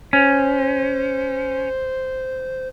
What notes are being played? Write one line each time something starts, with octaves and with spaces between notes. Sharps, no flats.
C#4 C5